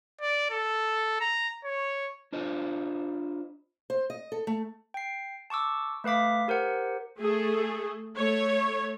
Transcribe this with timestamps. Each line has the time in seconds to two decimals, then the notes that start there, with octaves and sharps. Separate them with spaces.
0.21 D5
0.51 A4
1.21 A#5
1.65 C#5
2.33 D4 F4 C5 D#5
3.90 C5
4.10 D#5
4.32 A4
4.47 A3
4.94 G5 C7
5.50 A5 C#6 D6 E6
6.04 A3 B4 F5 D6 B6
6.48 G4 A#4 C5 F#5
7.19 A3 G#4 A4
8.17 A3 C#5